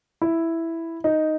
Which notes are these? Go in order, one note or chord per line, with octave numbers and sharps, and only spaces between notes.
E4
D#4